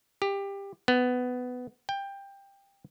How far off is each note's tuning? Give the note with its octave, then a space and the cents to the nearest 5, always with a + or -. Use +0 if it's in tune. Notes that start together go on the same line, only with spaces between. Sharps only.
G4 +20
B3 +15
G5 +15